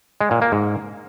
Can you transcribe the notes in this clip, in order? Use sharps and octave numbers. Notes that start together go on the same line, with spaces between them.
G#3
A#2
A#3
G#2